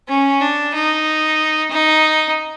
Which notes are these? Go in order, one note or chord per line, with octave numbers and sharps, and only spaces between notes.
C#4
D4
D#4
D#4